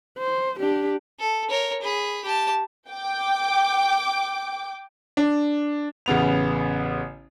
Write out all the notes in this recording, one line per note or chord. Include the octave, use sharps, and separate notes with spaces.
C5
D4 G4
A4
A#4 C#5
G#4 B5
G4 A5
G5 D6
D4
A1 C#3 B3 F7